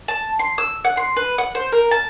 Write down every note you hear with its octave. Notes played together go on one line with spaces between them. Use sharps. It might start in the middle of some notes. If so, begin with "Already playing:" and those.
A5
C6
E6
F#5
C6
B4
F#5
C5
A#4
A5